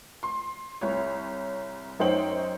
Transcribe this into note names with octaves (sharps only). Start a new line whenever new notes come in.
C6
C2 C#5
F#2 D#4 C5 C#5 G5 F#7